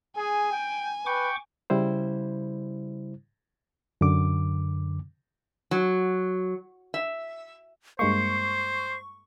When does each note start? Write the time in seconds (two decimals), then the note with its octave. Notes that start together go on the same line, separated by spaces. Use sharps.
0.17 G#4 G#5
0.52 G5
1.06 B4 G5 C#6 D6
1.70 C#3 G3 E4 C5
4.01 F#2 D3 D6
5.71 F#3
6.94 E5
7.99 G2 G#3 A#3 C5 C#6 C7